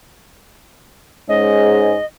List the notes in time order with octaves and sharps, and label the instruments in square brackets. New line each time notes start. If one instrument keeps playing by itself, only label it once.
[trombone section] G#2 G#3 C#4 [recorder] D#5